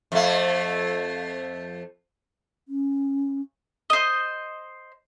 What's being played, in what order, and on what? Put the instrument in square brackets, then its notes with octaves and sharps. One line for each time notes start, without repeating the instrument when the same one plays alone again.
[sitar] F2 A3
[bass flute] C#4
[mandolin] C5 D#5